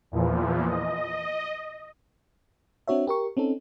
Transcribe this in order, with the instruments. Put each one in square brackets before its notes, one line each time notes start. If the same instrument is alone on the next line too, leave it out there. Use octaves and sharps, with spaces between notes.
[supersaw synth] E2 A#2 E3 F3
D#5
[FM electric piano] C4 D4 F#4 C#5 E5
G4 A#4 C#6
C4 C#4 D#4 A4